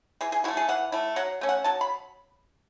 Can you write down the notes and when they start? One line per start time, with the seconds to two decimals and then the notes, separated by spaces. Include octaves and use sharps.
0.21 E3 G#4
0.32 G#4
0.44 A3 E4 F#4
0.57 G#4
0.69 E3 F#5
0.92 A3 E4
1.16 F#3 F#5
1.41 A3 C#4
1.49 F#5
1.64 F#3 A5
1.81 B5